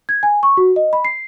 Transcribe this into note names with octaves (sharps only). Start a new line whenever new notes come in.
G#6
G#5
C#6
F#4
D#5
B5
C7